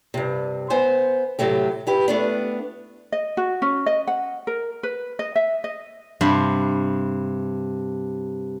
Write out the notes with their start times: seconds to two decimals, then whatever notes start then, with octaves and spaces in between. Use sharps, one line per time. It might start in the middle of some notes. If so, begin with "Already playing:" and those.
0.14 G2 C3
0.70 B3 C5 G#5
1.39 A2 C3 F#3 A3 G4
1.87 E4 G4 B4
2.08 A3 B3 D4
3.12 D#5
3.37 F#4
3.62 C#4
3.86 D#5
4.07 F#5
4.47 A#4
4.83 B4
5.19 D#5
5.35 E5
5.64 D#5
6.21 G2 C3 F#5 B5 C6